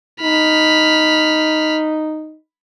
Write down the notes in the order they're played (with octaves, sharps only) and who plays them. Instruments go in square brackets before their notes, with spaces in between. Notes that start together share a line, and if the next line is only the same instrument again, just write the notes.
[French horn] D#4 [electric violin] B5 F6